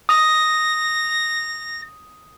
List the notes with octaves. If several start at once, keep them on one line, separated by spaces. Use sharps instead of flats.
D#6 A#6